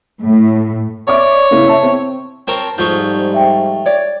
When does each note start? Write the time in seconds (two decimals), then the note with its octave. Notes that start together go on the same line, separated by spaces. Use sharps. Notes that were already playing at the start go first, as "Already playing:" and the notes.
0.23 A2
1.07 C#5 D5 E5 D6
1.51 C#3 A#3 E4
1.68 E5 A5
1.83 C4
2.47 C4 A#4 C5 C#5 A5
2.78 G#2 F3 G3 A3 F4 C#5 D#6 G6
3.34 E5 G5
3.86 C#5 D5